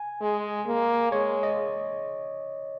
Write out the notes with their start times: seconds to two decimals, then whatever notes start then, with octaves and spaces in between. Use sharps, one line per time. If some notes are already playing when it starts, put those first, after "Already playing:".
Already playing: G#5
0.21 G#3
0.67 A#3
1.12 G#3 C#5
1.43 D#5